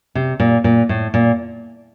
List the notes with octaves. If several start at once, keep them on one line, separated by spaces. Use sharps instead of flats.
C3
A#2
A#2
A2
A#2